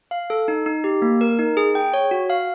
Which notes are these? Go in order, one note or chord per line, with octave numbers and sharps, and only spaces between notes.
F5
A4
D#4
D#4
G4
A#3
A#4
D#4
G#4
G5
C#5
F#4
F5